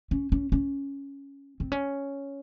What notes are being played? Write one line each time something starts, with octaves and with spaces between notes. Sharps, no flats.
C#4
C#4
C#4
C4
C#4